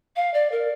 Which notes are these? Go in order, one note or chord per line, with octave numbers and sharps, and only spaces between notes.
F5
D5
A#4